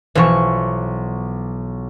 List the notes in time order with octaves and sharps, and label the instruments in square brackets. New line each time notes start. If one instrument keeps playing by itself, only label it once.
[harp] B1 C#6 [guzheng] E3 F3